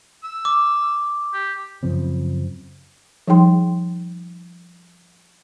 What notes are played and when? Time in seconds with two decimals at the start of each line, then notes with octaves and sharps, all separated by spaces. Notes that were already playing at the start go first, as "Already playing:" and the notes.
0.24 E6
0.45 D6
1.34 G4
1.83 F#2 C#3 F3 C4
3.28 F3 G3 D#4 G#4 G5 C6